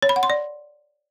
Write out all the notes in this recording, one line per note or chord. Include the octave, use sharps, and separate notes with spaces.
C#5
B5
F#5
C6
D5